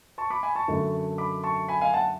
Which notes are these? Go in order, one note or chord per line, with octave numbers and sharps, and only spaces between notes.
A5 C#6
B5 D6
G#5 B5
A5 C#6
F#2 D3 F#3 A3
B5 D6
A5 C#6
G#5 B5
F5 G#5
F#5 A5